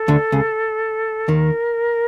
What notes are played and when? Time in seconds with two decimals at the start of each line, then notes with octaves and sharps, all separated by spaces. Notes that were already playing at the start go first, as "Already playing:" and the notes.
Already playing: A4
0.08 D2 D3
0.32 C#2 C#3
1.28 D#2 D#3 A#4